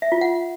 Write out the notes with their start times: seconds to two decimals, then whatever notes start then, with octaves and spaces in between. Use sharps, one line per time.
0.02 E5
0.12 F4
0.21 F#5